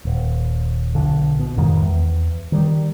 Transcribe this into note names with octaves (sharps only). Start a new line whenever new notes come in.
D#1
B1 D3
B2
A1 F2 D#3 G#3
E2
D#3 G3